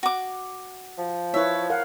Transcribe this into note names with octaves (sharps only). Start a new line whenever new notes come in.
F#4 D6
F3
E4 B4 C#5 E5
A#4 F5 F#5